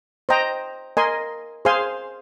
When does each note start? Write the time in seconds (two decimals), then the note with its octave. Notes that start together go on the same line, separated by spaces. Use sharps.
0.29 C5 D#5 G5 A#5
0.97 A#4 D#5 G#5 C6
1.65 G#4 C5 F5 G#5 C6